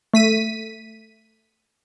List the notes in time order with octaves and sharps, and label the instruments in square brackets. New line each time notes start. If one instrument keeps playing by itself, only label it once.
[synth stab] A3 B6 D#7